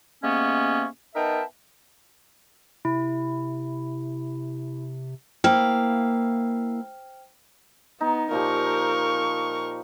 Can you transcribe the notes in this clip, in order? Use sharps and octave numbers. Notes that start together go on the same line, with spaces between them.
C3 G#3 A#3 B3 C#4 C#6
B3 D#4 A#4 E5 G5 A5
C3 E4
A#3 E4 C5 F5 G5 F6
B3 D#4
A#2 F3 G4 A#4 C#6